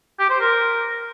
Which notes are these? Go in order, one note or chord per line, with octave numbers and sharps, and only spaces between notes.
G4
C5
A#4